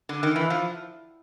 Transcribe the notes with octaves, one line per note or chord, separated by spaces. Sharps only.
D3
D#3
E3
F3